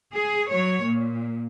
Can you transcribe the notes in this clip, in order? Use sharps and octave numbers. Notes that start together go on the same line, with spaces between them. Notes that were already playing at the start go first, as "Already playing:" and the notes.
G#4
F#3 C#5
A#2